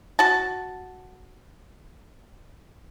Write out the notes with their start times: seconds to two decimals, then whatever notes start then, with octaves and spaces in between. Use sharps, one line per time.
0.19 F#4 A5